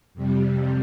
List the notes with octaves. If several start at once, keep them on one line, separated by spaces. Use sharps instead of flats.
F2 C3 G3